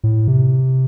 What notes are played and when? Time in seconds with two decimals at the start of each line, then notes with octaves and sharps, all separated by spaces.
0.04 A2
0.28 C3